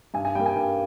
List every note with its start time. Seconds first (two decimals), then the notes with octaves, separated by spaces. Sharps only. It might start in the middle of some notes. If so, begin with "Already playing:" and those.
0.14 G2 G#5
0.25 G#5
0.35 G3 A#3 G5
0.46 G#5
0.56 G2 G5